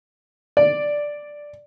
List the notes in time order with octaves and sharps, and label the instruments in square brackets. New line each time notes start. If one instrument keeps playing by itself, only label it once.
[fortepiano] D5